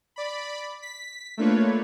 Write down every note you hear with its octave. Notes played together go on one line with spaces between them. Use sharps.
D5 B5
B6
A3 A#3 D4 F4 B4 C#5